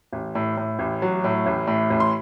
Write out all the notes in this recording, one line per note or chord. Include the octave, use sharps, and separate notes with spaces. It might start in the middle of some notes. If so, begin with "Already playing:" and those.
A1
A2
A2
A1
F#3
A2
A1
A2
A1
C6